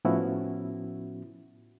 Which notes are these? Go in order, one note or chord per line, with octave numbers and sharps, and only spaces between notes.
A2 F3 B3 C#4 E4 F#4